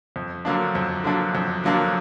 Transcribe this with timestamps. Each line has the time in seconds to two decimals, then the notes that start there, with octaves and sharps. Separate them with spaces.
0.16 F2
0.45 D3 F#3 A#3 D4
0.75 F2
1.04 D3 F#3 A#3 D4
1.35 F2
1.64 D3 F#3 A#3 D4